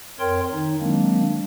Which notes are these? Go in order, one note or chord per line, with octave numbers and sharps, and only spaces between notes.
F2 A#4 C#5 G5 C6
D#3 D#4
D#3 F#3 G#3 A#3 C4 D4